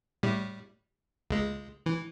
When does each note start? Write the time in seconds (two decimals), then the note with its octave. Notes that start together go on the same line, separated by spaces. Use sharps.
0.23 A2 G3
1.30 C#2 G#3
1.86 E3